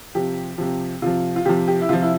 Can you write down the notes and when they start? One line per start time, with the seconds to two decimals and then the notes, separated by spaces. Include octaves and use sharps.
0.15 C3 F3 G4
0.58 C3 F3
1.02 C3 F3 F4
1.36 F4
1.45 C3 F3 G4
1.68 G4
1.82 E4
1.89 C3 F3 F4
2.02 E4